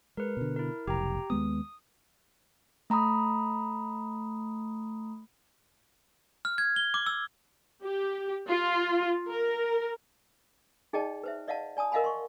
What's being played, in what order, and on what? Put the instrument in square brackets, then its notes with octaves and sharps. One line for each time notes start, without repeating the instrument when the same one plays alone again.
[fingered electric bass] G#3 [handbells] A#4 B4
[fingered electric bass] B2 D3
[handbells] E4 A#4
[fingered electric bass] F1 B1 [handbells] G4 G5 A#5
[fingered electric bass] D#2 G#3 B3 [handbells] D#6
[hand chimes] A3 A#5 B5 D#6
[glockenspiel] F6
G#6
G7
D6
E6
[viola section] G4
F4
A#4
[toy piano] D#4 G#4 D5 D#5 G5 A5
B4 C5 E5
D5 D#5 F5 F#5 A5
D5 G#5 A5 D#6
A#4 D#5 F5 F#5 G#5 B5
C6 C#6